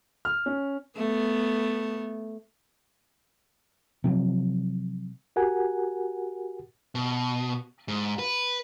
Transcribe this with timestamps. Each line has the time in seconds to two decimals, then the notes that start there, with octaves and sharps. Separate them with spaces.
0.25 F6
0.46 C#4
0.97 A3 B3
4.04 C3 F3 F#3
5.36 F#4 G4 A#4 F#5 G#5
6.95 B2
7.88 G#2
8.19 B4